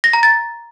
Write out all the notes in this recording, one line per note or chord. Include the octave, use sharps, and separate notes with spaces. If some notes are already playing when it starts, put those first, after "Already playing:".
A#6
A#5
A6